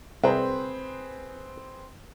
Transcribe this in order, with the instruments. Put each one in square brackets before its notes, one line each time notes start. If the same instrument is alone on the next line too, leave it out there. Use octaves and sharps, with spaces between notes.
[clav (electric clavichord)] C2 [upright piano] C4 G#4 B4